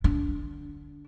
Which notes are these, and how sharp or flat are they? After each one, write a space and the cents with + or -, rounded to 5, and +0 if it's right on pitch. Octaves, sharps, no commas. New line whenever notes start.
D3 +0 D4 -20